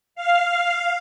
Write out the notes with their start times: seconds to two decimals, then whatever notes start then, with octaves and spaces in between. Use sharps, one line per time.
0.15 F5